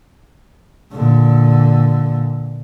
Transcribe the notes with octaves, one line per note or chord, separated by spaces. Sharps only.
A#2 D3